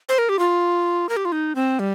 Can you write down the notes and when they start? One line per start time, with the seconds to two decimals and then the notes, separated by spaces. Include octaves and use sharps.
0.09 C5
0.18 A#4
0.29 G4
0.39 F4
1.09 A#4
1.17 G4
1.25 F4
1.32 D#4
1.55 C4
1.79 G3